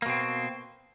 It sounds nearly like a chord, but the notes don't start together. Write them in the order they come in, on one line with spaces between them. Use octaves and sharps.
A#3 B2 C4